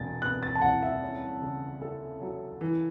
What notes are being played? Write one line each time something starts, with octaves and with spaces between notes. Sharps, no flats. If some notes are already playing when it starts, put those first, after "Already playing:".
Already playing: E1 B2 A6
B3 F#6
A6
A5
E2 F#5
E5
C#4
C#3
A4
F#3
E3